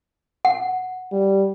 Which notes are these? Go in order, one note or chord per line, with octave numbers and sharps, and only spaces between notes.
F#5
G3